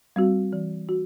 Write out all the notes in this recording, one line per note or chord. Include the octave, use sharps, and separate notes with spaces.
G3 C4 F#4
E3
F#4